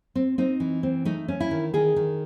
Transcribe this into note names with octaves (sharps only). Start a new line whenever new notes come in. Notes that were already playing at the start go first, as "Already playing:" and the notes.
C4
C4 D#4
E3
C4
A3 D#4
C#4
E4
D#3
D#3 G#4
D#3